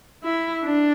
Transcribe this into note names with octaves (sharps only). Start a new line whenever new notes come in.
E4
D4